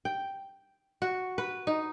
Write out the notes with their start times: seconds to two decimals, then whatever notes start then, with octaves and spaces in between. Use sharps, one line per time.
0.05 G5
1.02 F#4
1.38 B4
1.67 D#4